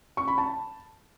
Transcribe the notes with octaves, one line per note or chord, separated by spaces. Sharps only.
C#6
B5
A5